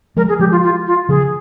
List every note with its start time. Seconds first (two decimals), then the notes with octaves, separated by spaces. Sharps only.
0.16 F3 G#3 A#4
0.29 G#4
0.39 F3 G#3 G4
0.51 F4
0.63 F4
0.87 F4
1.09 C#3 F3 G#4